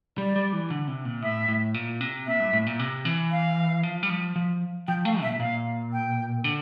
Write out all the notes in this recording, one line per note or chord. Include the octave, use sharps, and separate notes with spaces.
G3 D5
G3
E3
D3
C3
A#2
A2 E5
A2
A#2
C3
A#2 E5
G2
A2
A#2
C3
E3
F5
F3
G3
F3
F3
F3 G5
A3 F5
A#2 E5
A#2 F5
G5
D3